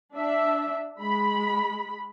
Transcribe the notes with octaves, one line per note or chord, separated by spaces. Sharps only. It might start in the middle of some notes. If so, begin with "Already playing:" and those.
D4 E5
G#3 B5